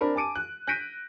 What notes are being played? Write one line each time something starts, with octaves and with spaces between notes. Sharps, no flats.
C4 D4 A#4 B5
G#5 A5 D6 D7 D#7
F#6
F#6 G6 A#6 B6 D7 D#7